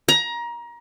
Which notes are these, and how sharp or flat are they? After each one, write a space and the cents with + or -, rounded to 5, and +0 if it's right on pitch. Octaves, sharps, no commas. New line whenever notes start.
A#5 +25